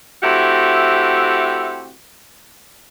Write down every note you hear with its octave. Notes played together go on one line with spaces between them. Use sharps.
A3 C4 E4 F#4 G4